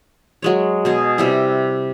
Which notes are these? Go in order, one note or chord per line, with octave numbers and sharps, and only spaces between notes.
F#3 G#3 C#5
B2 G#4
C3 G3 E4